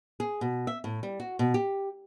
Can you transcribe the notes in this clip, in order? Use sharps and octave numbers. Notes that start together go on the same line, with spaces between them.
G#4
B2
E5
A2
G3
F#4
B2
G4